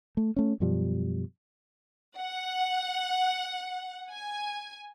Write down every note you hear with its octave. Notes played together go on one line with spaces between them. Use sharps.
A3
A3 C#4
F#2 B2 F3 G3
F#5
G#5